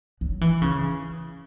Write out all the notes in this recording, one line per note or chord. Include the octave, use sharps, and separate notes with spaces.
F#3
E3
C#3